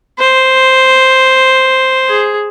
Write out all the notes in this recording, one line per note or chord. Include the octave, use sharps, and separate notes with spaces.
C5
G#4